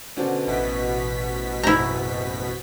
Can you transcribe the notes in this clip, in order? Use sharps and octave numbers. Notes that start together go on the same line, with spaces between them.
B2 D3 C#4 C5 D5
A1 B2 E4 B6
F#1 C4 E4 A#5 G6